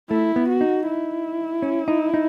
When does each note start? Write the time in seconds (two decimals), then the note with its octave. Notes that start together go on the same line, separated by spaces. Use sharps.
0.10 A3 E4
0.36 B3
0.49 F#4
0.61 D#4
0.87 E4
1.62 C#4
1.88 D#4
2.14 D#4